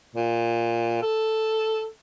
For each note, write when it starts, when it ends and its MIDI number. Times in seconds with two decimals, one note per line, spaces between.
0.15 0.98 46
1.02 1.86 69